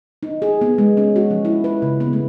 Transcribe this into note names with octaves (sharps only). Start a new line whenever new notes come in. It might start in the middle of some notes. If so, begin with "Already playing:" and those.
D#4
G#4
B3
G#3
C#4
F#4
F3
E4
B4
C#3
B3
A3